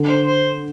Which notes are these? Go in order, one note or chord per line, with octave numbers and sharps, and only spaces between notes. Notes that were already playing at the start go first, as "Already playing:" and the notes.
Already playing: D3
C5
C5